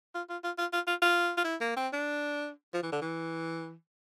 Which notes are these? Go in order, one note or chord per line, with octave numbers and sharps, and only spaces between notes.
F4
F4
F4
F4
F4
F4
F4
F4
E4
A#3
C4
D4
F3
E3
D3
E3